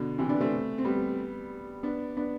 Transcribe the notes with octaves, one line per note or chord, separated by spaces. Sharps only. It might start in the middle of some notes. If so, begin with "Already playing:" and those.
Already playing: B2 D3
C3 E3
B3 D4
A3 C4
C4
G3 B3
B3 D4
B3 D4